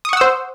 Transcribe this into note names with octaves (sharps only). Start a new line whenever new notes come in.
C5 F#5 C#6 D#6 E6